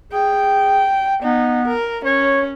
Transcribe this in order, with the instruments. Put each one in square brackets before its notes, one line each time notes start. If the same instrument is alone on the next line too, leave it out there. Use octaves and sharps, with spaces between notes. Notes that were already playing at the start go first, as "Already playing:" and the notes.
[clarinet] G#4 [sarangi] G5
[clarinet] B3 [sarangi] D#4
[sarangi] A#4
[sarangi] C#4 [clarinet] C#5